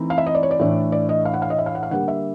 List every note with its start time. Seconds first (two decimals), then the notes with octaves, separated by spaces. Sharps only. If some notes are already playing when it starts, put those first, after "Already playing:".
Already playing: E3 A3 C4 D#4
0.10 F5
0.18 E5
0.27 D#5
0.35 D5
0.43 C#5
0.51 D5
0.59 A2 E3 A3 D4
0.92 D5
1.09 D#5
1.25 F5
1.34 F#5
1.42 F5
1.50 D#5
1.58 E5
1.66 F5
1.75 F#5
1.83 F5
1.91 D3 G3 A#3 F#5
2.08 E5